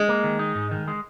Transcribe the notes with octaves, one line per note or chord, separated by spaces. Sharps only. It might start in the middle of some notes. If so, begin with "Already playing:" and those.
Already playing: G#3
A#3
D#3
D#4
G#2
D#3
G#3